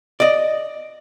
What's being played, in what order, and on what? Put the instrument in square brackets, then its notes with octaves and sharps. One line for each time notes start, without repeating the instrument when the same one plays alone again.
[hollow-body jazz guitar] D5 D#5